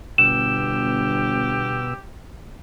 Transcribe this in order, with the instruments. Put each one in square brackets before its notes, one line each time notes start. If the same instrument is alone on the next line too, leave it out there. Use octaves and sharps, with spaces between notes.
[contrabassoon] G1 [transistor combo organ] B2 E6 [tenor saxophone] G4 [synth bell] E7